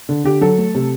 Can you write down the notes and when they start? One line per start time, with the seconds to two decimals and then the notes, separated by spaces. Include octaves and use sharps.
0.09 D3
0.24 D3 G4
0.41 F#3 A4
0.58 A3
0.75 C3